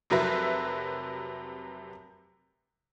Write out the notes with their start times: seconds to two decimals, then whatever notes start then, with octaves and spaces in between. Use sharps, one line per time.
0.10 F1 C3 F#3 A#4 B4 E5